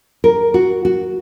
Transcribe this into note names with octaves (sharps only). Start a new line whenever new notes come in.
A#4
F#4
F#4